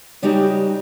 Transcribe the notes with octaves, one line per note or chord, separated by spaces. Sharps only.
C#3 G3 D#4 F#4 G4